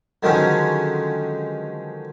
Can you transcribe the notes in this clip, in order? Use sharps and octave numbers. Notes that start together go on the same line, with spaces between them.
D3 D#3 F3 F#3 G#3 C#4